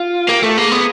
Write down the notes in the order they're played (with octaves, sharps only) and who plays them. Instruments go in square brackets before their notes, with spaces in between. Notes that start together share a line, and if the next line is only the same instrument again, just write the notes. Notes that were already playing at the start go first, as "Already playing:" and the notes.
Already playing: [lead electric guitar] F4
[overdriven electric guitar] A#3 [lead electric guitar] G4
[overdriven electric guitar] A3 [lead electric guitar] A4
[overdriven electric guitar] A#3 [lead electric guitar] G#4
[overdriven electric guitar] B3